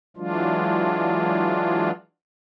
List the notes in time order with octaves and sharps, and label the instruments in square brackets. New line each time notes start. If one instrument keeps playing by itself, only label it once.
[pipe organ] E3 F#3 G#3 D4 F4